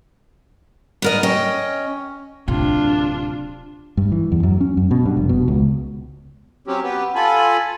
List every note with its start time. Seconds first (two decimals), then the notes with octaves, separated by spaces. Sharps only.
1.02 B3 A#4 D#5
1.23 C#4 D#5 G5
2.48 D1 C3 D4 F4
3.97 G2
4.12 E3
4.32 E2
4.43 F#2
4.61 C#4
4.77 F#2
4.91 B2
5.05 G2
5.17 F1
5.29 B2
5.48 C#2
6.67 F#3 C4 C#4 G4
6.84 B3 G4 B4
7.15 F4 A4 G#5 B5